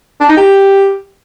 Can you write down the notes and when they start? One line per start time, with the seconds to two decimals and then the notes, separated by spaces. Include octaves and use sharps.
0.21 D4
0.29 D#4
0.37 G4